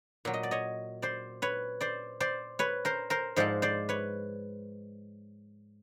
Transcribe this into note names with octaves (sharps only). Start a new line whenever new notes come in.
A#2 F#3
D#5
D5
C#5 D#5
C5 D5
B4 C#5
C5 D5
C5 D5
B4 C#5
A#4 C5
A#4 C5
G#2 F3 G#3 C5 D5
C5 D5
B4 C#5